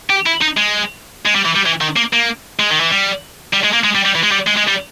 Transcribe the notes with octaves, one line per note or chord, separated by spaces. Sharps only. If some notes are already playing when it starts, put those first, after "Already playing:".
G4
E4
D#4
G#3
G#3
G3
E3
G3
E3
D#3
A#3
A#3
G#3
D#3
E3
G3
G3
G#3
A#3
G#3
G3
G3
E3
G#3
G3
G#3
G#3
G3